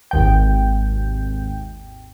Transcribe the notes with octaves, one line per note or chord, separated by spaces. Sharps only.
G#1 D#2 G5